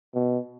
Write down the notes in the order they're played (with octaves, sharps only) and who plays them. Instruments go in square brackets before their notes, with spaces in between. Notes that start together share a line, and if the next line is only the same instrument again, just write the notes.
[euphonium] B2